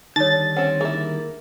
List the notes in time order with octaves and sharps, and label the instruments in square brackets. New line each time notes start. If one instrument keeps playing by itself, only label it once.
[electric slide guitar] D3 D#3 G3 [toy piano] D#4 C#5 [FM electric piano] A6
[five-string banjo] C4 C#4 [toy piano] F#5
[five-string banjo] A#3 E4 [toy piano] G#4